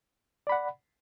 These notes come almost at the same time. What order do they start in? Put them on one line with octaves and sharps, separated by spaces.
D5 B5 F#5